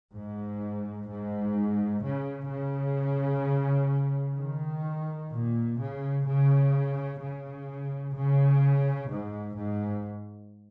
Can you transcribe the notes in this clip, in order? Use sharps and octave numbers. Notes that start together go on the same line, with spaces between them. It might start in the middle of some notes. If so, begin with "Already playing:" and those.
G#2
G#2
C#3
C#3
D#3
A#2
C#3
C#3
C#3
C#3
G#2
G#2